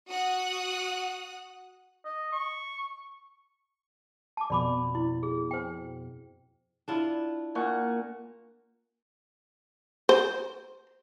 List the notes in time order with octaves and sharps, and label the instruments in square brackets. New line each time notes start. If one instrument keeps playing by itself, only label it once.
[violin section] F#4 F#5 D#6 F#6
[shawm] D#5
C#6
[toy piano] A5 D6
[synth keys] F2 B2 [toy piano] D5 B5 D6
[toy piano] E4
G#4
C5 G5
[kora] D4 E4 F4
[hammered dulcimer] A#2 F#5 C#6
[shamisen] C5